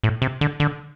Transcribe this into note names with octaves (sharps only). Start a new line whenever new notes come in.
A2
C3
D3
D3